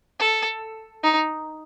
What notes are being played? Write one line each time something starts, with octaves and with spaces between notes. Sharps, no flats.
A4
D#4